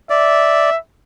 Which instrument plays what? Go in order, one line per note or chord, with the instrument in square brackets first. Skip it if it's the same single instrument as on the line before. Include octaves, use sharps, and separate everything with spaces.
[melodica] D5 [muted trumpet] E5